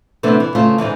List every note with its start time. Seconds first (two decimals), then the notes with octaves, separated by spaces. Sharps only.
0.23 C3 E3 A3 B3 C4 D4
0.40 E3
0.55 C#3 A3 F4 C5
0.78 G#2 B2 D3 E3